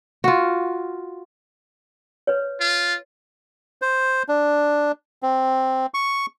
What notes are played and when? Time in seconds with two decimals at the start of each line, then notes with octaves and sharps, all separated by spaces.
0.24 F4 F#4
2.27 B4 C#5
2.60 F4
3.82 C5
4.28 D4
5.23 C4
5.94 C#6